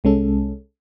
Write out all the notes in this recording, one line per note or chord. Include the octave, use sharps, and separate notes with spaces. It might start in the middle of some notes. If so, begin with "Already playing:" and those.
C2 G#3 C#4 A4